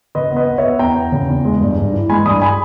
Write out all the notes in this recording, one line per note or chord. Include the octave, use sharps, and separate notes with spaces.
C#3 B4 D#5
B3
B4 D#5
B3
C#5 E5
B3
E2 G5 A#5
B3
C#3
E2
G#3
G2
G2
E3
G#3 G#5 B5
G2 B5 D#6
G#5 B5